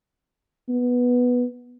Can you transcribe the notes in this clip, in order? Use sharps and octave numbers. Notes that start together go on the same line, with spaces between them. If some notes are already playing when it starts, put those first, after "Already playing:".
B3